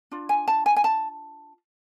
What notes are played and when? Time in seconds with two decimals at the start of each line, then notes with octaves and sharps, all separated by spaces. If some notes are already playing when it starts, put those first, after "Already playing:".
0.11 D4 F4
0.29 G#5
0.48 A5
0.66 G#5
0.76 G#5
0.84 A5